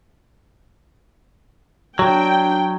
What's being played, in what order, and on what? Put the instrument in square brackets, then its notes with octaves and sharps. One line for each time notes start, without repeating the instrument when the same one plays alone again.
[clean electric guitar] F#3 [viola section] D4 G5